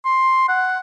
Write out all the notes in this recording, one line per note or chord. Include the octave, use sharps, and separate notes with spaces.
C6
F#5